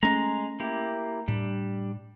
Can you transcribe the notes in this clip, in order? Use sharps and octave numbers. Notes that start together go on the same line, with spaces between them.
G#3 A3 C#4 A#5
A#3 E4 G4
A2 G3 D4